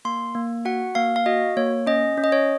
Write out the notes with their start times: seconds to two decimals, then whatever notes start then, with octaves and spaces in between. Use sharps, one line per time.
0.05 A#3 C6
0.35 A#3
0.65 F#4 F#5
0.95 A#3 F5
1.16 F5
1.26 F#4 D#5
1.57 A#3 C#5
1.87 C#4 D#5
2.17 C#4
2.24 D#5
2.32 C#5